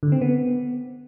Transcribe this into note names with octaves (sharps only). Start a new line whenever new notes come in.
D3
C4
B3